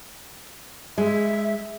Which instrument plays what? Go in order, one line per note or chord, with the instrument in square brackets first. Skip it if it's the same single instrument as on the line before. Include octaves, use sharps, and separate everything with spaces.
[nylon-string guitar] G#3 [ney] E5